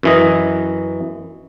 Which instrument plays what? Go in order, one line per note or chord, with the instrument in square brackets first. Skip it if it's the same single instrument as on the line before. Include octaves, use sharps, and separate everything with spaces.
[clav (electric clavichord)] F#2 E3 D#5